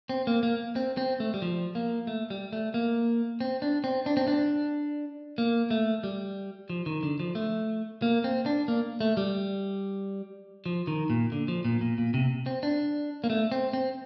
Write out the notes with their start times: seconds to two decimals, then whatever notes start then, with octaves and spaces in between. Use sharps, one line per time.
0.09 C4
0.27 A#3
0.43 A#3
0.76 C4
0.97 C4
1.20 A3
1.34 G3
1.42 F3
1.75 A#3
2.07 A3
2.30 G3
2.53 A3
2.74 A#3
3.41 C4
3.62 D4
3.84 C4
4.06 D4
4.17 C4
4.28 D4
5.38 A#3
5.71 A3
6.04 G3
6.70 F3
6.86 D#3
7.03 D3
7.20 F3
7.35 A3
8.02 A#3
8.24 C4
8.46 D4
8.68 A#3
9.00 A3
9.17 G3
10.66 F3
10.87 D#3
11.10 A#2
11.32 D3
11.48 F3
11.65 A#2
11.81 A#2
11.98 A#2
12.14 C3
12.46 C4
12.63 D4
13.24 A#3
13.30 A3
13.52 C4
13.73 C4